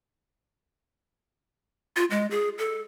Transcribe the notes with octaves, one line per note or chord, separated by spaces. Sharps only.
F4
G#3
G#4
A4